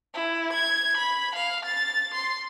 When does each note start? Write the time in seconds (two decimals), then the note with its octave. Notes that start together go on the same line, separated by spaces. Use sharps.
0.14 E4
0.53 G#6
0.97 B5
1.35 F5
1.65 A6
2.14 C6